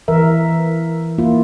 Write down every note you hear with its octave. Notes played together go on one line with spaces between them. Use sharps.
E3 A#4 E5
A#3 E4 F4